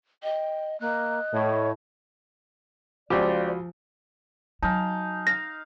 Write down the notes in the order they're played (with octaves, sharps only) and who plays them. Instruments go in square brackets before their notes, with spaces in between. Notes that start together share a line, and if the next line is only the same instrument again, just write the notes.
[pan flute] D#5 [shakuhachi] G5
[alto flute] A#3 [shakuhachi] D#5 [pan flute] F#6
[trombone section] A2 [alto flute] C#5
[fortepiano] C#2 G4 [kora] F3 [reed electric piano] F#4 F5 B5 [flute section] C5 D5
[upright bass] F#3 [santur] D#4 F5 [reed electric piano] G#5 A5
[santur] F5 [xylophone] A#6